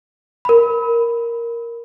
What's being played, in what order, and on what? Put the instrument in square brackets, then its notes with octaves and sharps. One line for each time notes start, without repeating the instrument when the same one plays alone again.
[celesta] A#4 B5